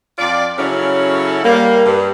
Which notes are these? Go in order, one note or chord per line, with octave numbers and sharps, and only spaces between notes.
F2 F4 D5
C#3 F#3 C#4 E4 A4
G3 A#3
G2